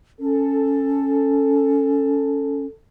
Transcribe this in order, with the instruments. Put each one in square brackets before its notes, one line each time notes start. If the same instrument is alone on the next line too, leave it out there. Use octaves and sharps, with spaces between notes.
[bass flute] C#4 [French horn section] A4